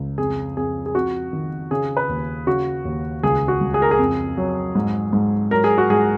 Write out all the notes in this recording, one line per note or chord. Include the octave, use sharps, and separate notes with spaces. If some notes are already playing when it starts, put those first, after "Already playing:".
Already playing: C#2
F2 G#4
F2 G#4
G#4
F2 F#4
D#3
C#3 G#4
B4
D#2
C#3 F#4
D#2
C#2 G#4
F#4
C#2
G#4
A#4
G#4
F2
F#3
G#2
G#2
F#3 A#4
G#4
F#4
G#2 G#4